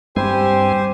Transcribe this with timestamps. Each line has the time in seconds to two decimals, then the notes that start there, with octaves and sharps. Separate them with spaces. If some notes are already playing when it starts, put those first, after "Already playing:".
0.16 G2 G3 C4 G4 C5 G#5